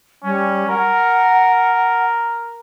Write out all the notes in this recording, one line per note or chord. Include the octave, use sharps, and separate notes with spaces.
G3 C#4
A#4 F#5